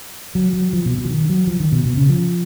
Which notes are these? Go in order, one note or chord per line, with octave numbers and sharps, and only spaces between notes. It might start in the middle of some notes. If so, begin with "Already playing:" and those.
F#3
F#3
F3
B2
B2
F3
D#3
F#3
F3
D#3
B2
B2
C#3
F3